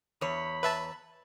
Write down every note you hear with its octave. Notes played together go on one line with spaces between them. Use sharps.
E2 C#5 B5
B4 E5 A5